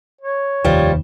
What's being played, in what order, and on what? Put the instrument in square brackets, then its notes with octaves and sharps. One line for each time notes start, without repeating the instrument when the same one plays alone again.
[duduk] C#5
[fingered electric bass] F1 D#2 D#3 [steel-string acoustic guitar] F3 G3